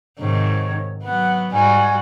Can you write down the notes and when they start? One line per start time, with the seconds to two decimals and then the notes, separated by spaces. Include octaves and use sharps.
0.19 G#2 C3 D#3 C#5
1.03 F#3 B3 F#5
1.52 G#2 G3 F#4 G#5